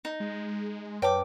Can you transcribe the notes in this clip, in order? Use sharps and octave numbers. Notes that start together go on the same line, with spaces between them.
D#4
G#3
F#2 B4 C#5 G5 A5 D6